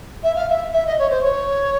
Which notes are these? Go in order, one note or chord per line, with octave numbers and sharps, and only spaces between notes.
E5
F5
E5
E5
D#5
C#5
C5
C#5